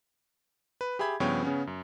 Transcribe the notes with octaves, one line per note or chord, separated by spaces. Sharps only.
B4
G4 G#4 E5 B5 G#6
G2 C#3 F3 B3 C#5 G5
C#3 B3 C#4
F#2